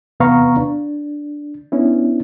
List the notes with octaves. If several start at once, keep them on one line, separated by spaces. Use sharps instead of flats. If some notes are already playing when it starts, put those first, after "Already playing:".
E2 C3 B3 F5 A#5 C#6
D4
B3 C#4 D4 E4